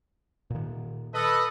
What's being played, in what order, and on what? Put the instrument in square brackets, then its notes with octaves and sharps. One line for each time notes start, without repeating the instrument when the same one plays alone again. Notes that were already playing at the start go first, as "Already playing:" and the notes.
[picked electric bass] A#2 D#3
[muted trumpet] A4 [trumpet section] B4 D#5